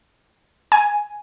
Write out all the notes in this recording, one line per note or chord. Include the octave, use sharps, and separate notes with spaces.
G#5